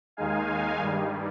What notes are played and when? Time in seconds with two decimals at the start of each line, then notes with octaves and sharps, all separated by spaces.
0.17 D#2 D#3 G#3 D#4 F5 G#5
0.78 G2 D#3 G3